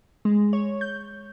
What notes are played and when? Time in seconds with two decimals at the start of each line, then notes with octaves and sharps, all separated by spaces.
0.25 G#3
0.53 C#5
0.81 G6